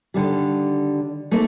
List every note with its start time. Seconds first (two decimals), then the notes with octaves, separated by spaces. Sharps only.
0.14 D3 D#3 G3
1.31 A3 A#3 C4 D#4 A4